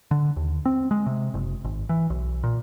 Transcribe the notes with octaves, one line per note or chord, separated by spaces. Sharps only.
D3
D#2
C4
G#3
C3
F#1
G#1
E3
B1
A#2